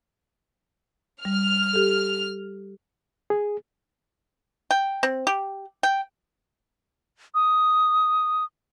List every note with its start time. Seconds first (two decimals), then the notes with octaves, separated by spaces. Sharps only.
1.25 G3 F6
1.73 G4 A4
3.30 G#4
4.71 G5
5.03 C4
5.27 G4
5.83 G5
7.35 D#6